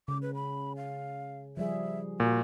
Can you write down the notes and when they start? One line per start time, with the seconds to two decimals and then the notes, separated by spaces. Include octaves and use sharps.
0.08 C#3 D6
0.22 B4
0.35 B5
0.76 F5
1.57 F3 G3 G#4 E5
2.20 A#2 F#4